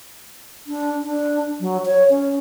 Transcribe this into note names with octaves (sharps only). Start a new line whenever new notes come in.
D4
D4
F#3
C#5
C#4